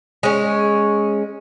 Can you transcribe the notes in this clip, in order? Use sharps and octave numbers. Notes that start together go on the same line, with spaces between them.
G#3 C#4